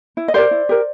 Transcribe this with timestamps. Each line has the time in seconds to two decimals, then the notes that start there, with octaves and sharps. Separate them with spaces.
0.17 E4
0.28 D#5
0.34 G4 A#4 C5 D5
0.51 E4
0.69 G4 A#4